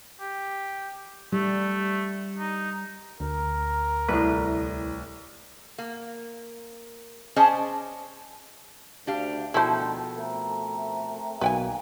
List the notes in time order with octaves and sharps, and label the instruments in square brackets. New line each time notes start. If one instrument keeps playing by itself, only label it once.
[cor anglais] G4
[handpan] G3 [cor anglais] A3
[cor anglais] D#4
[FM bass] D2 [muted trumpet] A#4
[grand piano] C2 [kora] A2 B4
[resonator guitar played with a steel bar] A#3
C#4 G#4 C5 D5 D#5 A5
[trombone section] D2 [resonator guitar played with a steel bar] D4 G4 F5
[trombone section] D2 G#2 D#3 [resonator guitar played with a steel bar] B2 F3 [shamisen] E4 C5 [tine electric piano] A4
[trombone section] A3 C4 A#4
[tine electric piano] B1 B2 [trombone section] D#3 A#3 [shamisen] B4 G5 G#5